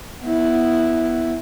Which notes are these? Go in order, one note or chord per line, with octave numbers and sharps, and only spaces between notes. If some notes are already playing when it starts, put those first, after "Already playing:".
B3 E4